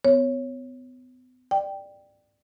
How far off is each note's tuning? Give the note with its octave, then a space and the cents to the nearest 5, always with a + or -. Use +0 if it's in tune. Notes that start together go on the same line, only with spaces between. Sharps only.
B3 +40 C#5 -10
D5 +15 G5 +0